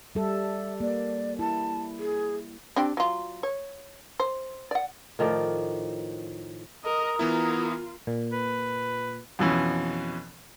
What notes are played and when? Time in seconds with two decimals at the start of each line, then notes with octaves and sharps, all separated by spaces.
0.15 G3 A4 E5
0.80 A#3 D5
1.39 E4 A5
1.98 G#4
2.76 C4 D4 G4
2.97 F#3 F4
3.43 C#5
4.20 C5
4.71 D5 F#5
5.19 A2 D#3 F3 D5
6.85 A#4 D#5 A#5 D#6
7.19 E3 B3 E4 F4 A#4
8.07 A#2
8.32 B4
9.39 F2 B2 E3 C#4